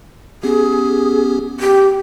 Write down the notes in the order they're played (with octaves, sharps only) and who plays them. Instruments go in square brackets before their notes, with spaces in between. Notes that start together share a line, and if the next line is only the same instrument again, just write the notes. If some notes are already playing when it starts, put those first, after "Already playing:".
[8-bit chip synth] B3 C#4 G4 [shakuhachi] G#4
[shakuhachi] G4